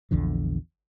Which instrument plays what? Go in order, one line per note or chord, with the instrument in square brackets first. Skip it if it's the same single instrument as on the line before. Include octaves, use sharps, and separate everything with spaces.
[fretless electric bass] A#1 E2 D3 F3